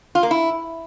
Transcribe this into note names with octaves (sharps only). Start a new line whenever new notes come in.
F4
A#3
E4